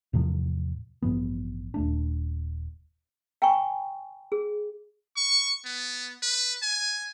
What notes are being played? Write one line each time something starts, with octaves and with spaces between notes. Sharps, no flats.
E2 A2 C3 F3
A1 G2 F3 B3
D#1 A3 D4
F5 G5 G#5 A#5 C#6
G#4
C#6
B3
B4
G#5